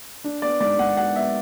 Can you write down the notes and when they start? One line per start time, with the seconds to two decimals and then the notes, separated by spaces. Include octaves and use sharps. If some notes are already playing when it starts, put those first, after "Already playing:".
0.24 D4
0.42 B3 D5
0.60 G#2 D5
0.79 G#2 F#5
0.97 B3 F#5
1.15 B3 E5